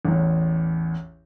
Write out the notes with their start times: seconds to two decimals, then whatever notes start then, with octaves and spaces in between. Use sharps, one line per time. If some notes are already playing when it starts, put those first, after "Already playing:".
0.05 A1 E2